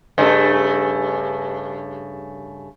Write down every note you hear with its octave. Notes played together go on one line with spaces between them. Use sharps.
G2 C#3 A3